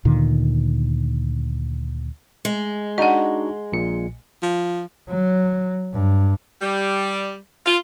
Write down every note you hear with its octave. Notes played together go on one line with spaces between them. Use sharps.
D2 A#2 D3 D#3
G#3
D4 D#4 F#4 D#5 F#5
A#1 A#2 C#7
F3
F#3
G2
G3
F4